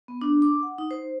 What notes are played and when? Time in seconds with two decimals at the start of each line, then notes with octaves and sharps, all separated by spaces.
0.08 B3
0.21 D4
0.42 D6
0.63 F#5
0.78 D#4
0.91 C5